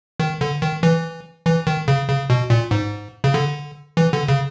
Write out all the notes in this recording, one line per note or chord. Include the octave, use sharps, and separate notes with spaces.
D#3
D3
D#3
E3
E3
D#3
C#3
C#3
B2
A#2
G#2
C#3
D3
E3
D3
C#3